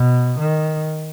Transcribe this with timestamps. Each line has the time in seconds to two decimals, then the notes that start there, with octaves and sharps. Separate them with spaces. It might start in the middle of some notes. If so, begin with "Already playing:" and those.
Already playing: B2
0.39 D#3